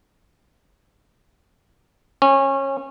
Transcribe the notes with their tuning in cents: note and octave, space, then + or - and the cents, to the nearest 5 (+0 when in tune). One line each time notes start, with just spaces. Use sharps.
C#4 -25